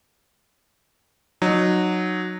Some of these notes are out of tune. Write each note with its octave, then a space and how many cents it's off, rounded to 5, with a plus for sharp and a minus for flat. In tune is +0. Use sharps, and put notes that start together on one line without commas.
F#3 -10 D#4 -25